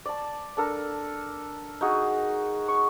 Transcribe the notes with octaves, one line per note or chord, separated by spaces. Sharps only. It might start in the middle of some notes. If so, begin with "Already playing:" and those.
D5 A5
D4 A4 A#4
D#4 F#4 G#4
C#6